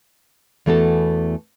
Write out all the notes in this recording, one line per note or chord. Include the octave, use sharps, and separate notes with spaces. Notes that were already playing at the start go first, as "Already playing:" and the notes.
E2 E3 A3 B3 F#4 A4